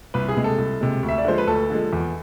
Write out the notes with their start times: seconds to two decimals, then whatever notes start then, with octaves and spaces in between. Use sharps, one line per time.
0.14 C2 B4
0.28 G#4
0.36 C3 G#3
0.44 A4
0.58 C2
0.81 C3 G#3
1.03 D2
1.09 E5
1.18 D5
1.25 D3 F3 G#3 C5
1.38 B4
1.47 D2 A4
1.70 D3 F3 G#3
1.93 E2